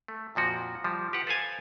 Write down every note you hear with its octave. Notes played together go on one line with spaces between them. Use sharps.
A3
F2 A#2 F3 F#4
F3 G3
G4 B4 F#5
A4 B4 C5 F5 G#5 A5